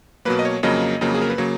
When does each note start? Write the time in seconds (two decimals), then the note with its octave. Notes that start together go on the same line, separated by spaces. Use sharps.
0.25 B2 F#3 A#3 B4
0.39 D#5
0.45 C#5
0.63 F2 C#3 F#3 A#3 D#5
1.01 F2 C#3 F#3 A#3
1.15 G#4
1.22 A#4
1.30 B4
1.38 C#3 F#3 A#3 C#5